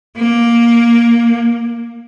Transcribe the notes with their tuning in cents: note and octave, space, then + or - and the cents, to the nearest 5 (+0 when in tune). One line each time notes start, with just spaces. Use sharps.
A#3 +10